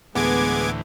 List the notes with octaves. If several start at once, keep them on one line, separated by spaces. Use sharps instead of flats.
D2 A2 E3 G#3 B3 D6 G#6